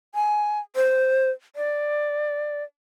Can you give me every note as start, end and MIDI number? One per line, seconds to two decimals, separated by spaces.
0.15 0.59 80
0.76 1.30 72
1.56 2.63 74